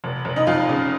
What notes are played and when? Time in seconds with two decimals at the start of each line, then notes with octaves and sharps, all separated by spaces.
0.04 F1
0.25 F1
0.36 D#4 D#5
0.47 F2 F4 F5
0.69 C#3